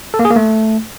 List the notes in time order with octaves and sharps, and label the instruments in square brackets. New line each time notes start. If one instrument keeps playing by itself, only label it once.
[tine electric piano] A4
A#3
G#4
A#3
A3